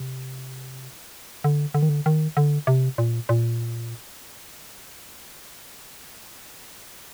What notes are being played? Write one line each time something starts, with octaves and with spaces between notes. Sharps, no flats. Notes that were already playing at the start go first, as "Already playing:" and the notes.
Already playing: C3
D3
D3
D#3
D3
D#3
D3
C3
A#2
A#2